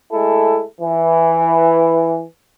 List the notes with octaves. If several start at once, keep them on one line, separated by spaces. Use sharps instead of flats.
G#3 A3 E4 A4
E3